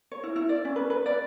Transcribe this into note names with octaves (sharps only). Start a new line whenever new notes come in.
C#5
E4
E4
D5
C#4
B4
B4
D5